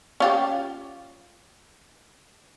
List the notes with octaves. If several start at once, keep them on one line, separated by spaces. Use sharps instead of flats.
C#4 F4 G4